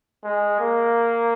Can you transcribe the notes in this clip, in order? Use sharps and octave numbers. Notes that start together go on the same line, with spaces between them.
G#3
A#3